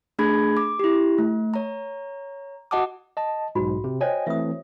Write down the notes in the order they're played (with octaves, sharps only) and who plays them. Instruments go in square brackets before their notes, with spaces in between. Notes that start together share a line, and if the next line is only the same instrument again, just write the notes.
[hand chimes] A3 D4 G#4 B5 G#6
D6
E4 G4
A3
C#5 A#5
F#4 D#5 F#5 A5 D6 D#6
[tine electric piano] D#5 A5
[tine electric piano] B1 G#2 [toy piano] F#4 B5
[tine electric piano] C3
[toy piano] C5 C#5 [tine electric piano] D#5 G5 G#5
[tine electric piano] E3 A3 C4 [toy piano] E5 D#6